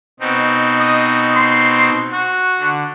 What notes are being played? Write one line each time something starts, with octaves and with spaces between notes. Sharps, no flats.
B2 C4 D#4
D#5
C6
F#4
D3